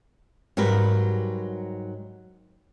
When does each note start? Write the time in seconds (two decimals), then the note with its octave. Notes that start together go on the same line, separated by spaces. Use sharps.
0.57 G#2 F#3 G3 A#4 B4